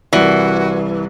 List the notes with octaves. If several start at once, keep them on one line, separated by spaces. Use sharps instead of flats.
C2 E3 F#4 A#4 D5